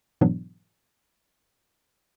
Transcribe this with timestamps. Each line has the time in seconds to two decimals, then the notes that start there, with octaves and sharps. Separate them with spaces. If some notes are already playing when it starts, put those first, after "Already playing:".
0.21 G#2 B2 E3 F#3 B3 D4